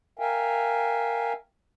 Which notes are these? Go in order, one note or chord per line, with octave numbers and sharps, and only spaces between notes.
A#4 E5 F5 G5 G#5